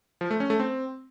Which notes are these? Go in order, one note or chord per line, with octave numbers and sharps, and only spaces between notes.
F3
A3
C#4
A3
C4